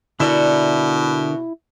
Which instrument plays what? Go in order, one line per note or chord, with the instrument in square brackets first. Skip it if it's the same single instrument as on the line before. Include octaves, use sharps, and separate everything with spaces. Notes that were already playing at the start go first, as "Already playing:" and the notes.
[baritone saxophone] B2 [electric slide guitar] D3 A#4 [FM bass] E4 [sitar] F#4 D5 E5